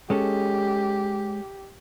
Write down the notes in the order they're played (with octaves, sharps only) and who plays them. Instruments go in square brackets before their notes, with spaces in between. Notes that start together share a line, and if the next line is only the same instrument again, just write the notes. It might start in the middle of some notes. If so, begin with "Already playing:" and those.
[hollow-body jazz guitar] G#3 C#4 A4 [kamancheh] G4